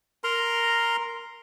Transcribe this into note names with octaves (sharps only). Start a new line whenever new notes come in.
A#4 A#5 C6